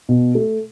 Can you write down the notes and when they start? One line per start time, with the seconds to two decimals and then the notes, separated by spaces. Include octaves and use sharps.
0.09 B2
0.35 A3